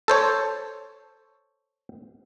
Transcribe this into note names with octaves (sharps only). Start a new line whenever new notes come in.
A4 C5 C#5